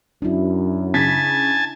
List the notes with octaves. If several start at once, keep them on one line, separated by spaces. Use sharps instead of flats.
F#2 D4 E4
C#3 G#5 A5 B6